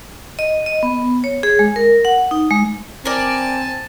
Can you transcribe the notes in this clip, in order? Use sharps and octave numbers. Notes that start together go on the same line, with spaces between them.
D#5
D#5
B3
C#5
G#4
G#3
A#4
F#5
D#4
G#3
C4 A#4 D5 G#5 A5